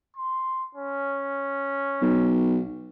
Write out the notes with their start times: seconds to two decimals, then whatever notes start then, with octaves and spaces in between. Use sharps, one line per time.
0.16 C6
0.75 C#4
2.02 B1